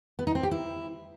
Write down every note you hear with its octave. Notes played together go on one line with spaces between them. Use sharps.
B3
D#4
C4
G4
E4